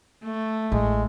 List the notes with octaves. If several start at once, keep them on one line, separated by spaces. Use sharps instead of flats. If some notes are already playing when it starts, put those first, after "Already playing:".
A3
A1 G#3